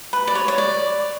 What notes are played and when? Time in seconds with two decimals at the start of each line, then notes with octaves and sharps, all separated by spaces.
0.13 B4
0.27 D5
0.35 C#5
0.48 C#5
0.58 D5